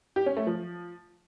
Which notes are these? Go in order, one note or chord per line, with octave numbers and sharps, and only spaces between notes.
G4
C#4
A3
F3